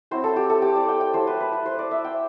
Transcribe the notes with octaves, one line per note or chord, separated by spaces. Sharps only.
F#3 C4 E4 C5
A4
G4
A4
G4
D5
G5
G5
F#3 A3 E4 C5
B4
B4
B4
C5
D5
E5
G5